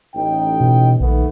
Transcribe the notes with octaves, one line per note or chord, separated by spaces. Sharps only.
A1 D#4 G5
B2
A#1 D#3 A3 B3